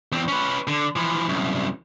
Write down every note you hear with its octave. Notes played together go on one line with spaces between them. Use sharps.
E2 C4
C#4 B4
D3
E3 F3
C2 F#2